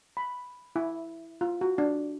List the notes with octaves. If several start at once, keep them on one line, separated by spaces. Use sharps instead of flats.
B5
E4
F4
F#4
D4